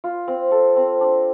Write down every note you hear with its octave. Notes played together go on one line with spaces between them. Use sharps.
F4
C4
A4
C4
D4